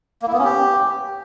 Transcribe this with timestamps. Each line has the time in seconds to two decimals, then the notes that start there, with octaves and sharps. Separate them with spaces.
0.22 A#3
0.28 E4
0.33 B3
0.39 C#4
0.44 G4